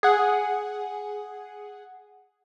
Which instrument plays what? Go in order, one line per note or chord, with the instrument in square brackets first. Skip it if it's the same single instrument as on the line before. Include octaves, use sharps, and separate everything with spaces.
[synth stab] G#4 F#5